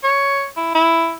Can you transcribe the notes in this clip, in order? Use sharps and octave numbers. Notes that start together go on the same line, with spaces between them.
C#5
E4
E4